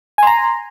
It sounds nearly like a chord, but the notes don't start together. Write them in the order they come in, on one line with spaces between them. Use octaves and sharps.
G#5 C6 A#5